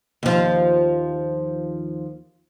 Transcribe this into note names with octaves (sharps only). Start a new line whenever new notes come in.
D#2 F3